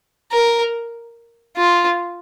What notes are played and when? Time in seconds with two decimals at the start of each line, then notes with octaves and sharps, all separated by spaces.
0.31 A#4
1.57 F4